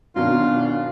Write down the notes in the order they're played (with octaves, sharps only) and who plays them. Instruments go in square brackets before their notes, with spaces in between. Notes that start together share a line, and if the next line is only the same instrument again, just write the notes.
[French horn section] F#2 D4 [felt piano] B2 D#3 F#3 [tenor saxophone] F4